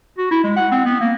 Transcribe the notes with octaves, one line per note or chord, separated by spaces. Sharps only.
F#4
E4
G#3
F#5
C4
B3
A#3